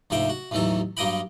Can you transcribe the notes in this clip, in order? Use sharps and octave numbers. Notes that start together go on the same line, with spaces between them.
D2 G#2 C3 F3 E5 G5
F#4
A1 D#2 B2 E3 F#3 A4
G2 F#3 A#3 D#5 G5 B5